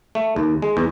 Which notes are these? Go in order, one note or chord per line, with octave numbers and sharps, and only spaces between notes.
A3
D#2
G#3
E2